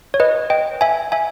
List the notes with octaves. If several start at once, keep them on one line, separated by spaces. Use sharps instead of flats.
C#5
B4 D#5
D#5 G5
E5 G#5
E5 G#5